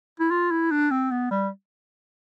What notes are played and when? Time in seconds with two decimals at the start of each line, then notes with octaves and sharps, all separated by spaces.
0.20 E4
0.31 F4
0.51 E4
0.71 D4
0.91 C4
1.11 B3
1.31 G3